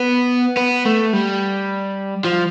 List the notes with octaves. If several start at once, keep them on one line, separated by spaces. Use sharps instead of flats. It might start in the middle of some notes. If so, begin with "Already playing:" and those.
Already playing: B3
B3
A3
G3
F3